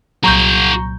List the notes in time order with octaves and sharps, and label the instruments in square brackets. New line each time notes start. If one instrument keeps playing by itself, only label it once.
[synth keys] C2 A#2 F#3 [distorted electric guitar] F#4 G#4 [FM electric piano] A#5 C#6 G6